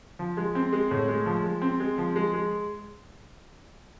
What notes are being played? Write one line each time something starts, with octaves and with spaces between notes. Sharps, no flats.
F3
G#3
C4
G#3
A2
G#3
F3
G#3
C4
G#3
F3
G#3
G#3